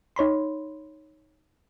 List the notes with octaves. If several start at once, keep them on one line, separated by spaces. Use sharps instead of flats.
D#4 C#5 B5 C6